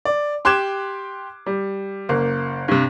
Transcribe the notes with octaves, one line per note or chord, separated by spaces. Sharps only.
D5
G4 C6 D6 F#6 G#6 E7
G3
F#1 A#3
G2 C3